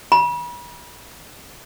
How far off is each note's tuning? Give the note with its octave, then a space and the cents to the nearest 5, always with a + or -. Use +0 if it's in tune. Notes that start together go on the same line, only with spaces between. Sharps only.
B5 -40